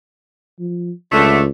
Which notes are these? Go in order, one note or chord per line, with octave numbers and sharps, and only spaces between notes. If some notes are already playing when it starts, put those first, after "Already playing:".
F3
C#2 D3 A3